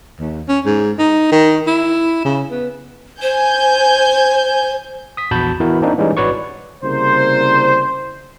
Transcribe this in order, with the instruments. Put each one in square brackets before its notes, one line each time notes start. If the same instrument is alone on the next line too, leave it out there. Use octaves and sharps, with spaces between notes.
[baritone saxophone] D#2
C#4
G#2
D#4
D#3
E4
C#3
B3
[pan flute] C5 [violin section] G#5 G6
[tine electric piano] D#6 B6
A#1 E2 F#4 A5 B5 G6
E3 B3 E4 F#4 A#4
A#3 C4 D4 D#4
E3 G3 G#3 C#4 D#4
G#1 F#4 B4 C#5 D5 C#6
[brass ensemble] C2 C#3 A#3 A#4 C5